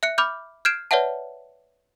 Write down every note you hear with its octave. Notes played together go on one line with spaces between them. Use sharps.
E5 F#6 C#7
B5 D6 F6 G6
F6 G6 G#6 C7 D7 E7
B4 C#5 D5 E5 F#5 A5